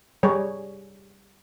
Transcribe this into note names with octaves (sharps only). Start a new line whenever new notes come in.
G3 G#4 C#5